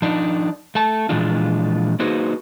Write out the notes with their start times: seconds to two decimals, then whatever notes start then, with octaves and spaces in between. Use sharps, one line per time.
0.02 F3 D4 D#4
0.75 A3 A5
1.09 A#2 E3 F3 G#3 D4 F4
1.99 A#3 D#4 F#4 G#4 B4 C5